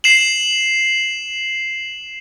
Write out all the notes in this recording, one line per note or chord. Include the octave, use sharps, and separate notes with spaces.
C7 E7 F#7